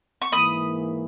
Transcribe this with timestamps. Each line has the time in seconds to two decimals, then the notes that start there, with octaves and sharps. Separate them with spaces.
0.22 C#6
0.32 G#2 E3 A#3 B5 D#6